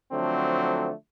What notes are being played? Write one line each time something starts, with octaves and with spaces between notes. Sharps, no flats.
D3 F3 F#3 A3 C4